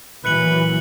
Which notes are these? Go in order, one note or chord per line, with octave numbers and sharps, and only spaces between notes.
A#2 E3 F#3 B4 F#6 C#7 F#7